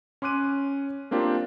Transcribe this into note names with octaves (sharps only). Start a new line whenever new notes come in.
C#4 C6 D6 F#6 D#7
A#3 C4 D4 F4 G4 A#4